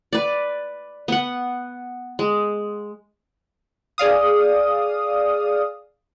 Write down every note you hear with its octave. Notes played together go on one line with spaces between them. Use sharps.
B4 D5
B3 F#5
G#3
G#4 D5 F5 D#6